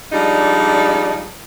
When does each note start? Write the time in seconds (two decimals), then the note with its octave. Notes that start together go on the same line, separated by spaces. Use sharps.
0.11 F3 G3 G#3 D4 D#4